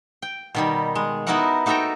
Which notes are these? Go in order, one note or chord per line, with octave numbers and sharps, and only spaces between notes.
G5
B2 D#3 G3
G#3
B3 D#4 E4 F#4 A#4 F#5
D#4 F#4 A4 E5 G5 A#5